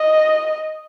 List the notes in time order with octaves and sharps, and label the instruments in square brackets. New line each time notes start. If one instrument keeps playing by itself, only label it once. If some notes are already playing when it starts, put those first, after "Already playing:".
Already playing: [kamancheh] D#5